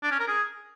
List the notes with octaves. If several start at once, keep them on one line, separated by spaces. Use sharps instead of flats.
D4
C#4
A#4
G#4